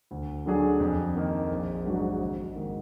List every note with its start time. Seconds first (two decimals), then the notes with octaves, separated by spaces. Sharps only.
0.11 D2
0.46 D3 F#3 D4 G#4
0.80 F2
1.16 D#3 A#3 D#4 A#4
1.51 A#1
1.85 G#2 F#3 D4 F#4
2.20 G#1
2.55 G#2 D#3 A#3